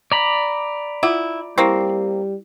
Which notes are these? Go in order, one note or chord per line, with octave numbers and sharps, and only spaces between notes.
D5 A#5 B5
E4 F4 F#5 D6
G3 A#3 C4 E4